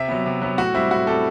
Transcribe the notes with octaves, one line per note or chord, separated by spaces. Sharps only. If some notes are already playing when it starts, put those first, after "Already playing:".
Already playing: C3 E5
F#3 B3
C3
F#3 B3
A2 F#4
G3 C4 E4
A2 F#4
G3 C4 A4